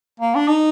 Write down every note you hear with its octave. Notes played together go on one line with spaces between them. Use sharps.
A#3
D4
D#4